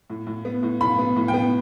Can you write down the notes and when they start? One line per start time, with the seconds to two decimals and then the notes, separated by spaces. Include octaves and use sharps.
0.10 A2
0.27 A2
0.45 B3
0.63 A2
0.81 A2 B5
0.99 B3
1.16 A2
1.28 G5
1.34 B3